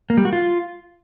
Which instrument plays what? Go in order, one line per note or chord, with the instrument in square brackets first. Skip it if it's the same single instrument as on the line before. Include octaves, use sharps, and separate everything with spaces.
[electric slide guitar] A#3
G3
F#4
F4